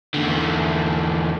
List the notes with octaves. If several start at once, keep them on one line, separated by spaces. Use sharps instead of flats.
E2 D3